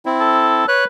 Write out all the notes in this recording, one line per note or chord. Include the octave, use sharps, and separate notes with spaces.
C4 E4
A4
B4 C#5 F#6